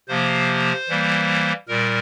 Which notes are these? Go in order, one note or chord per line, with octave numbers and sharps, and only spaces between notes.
C3 F3 A#3 C5
E3 G3 A#3
A#2 G3 A#4